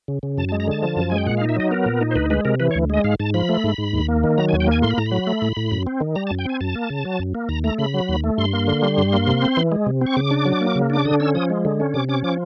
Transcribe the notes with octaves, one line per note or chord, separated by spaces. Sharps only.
C#3
C#3
F#2 A5
A5
G#3
A#5
D3 A5
F3
F#2
G#3 G#5
G5
A#2 F#5
F5
D#4
E5
F#3 D#5
B3 A#4
A#2
D#4
C5
D2 B4
G#3 B4
C3 A#4
E3 B4
C#5
D2
G#3 D#5
G#2 F5
G#2 A5
F3 B5
A3
G#2
G#2
D#2
A#3
D#3
F#3 A#5
G#5
D#2
G5
A#3 G#5
A2 C6
B5
A2 A#5
B5
F#3
A3
A2
A2
F#2
C4
D#3
G3 A#5
A5
F#2
G5
C4 G#5
F#2 A5
A#3
C#3
F#3
F#2
A#3
D#2 A#5
A3 A#5
C#3 B5
F#3
D#2
A3
G2 C6
A#3
D3
G3
G2
A#3
C3
C4
E3
G#3
C3
C4
C#6
C#3 D6
D4
F#3
A#3
C#3
D4 D6
D3 D#6
C#4 E6
F3 D#6
G#3
D3
C#4
C3 D6
C#4 D6
F3 D6